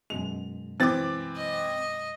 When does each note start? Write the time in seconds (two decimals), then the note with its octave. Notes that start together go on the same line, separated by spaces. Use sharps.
0.10 F#2 B2 G#3 F7
0.80 E3 C4 D6 A6
1.37 D#5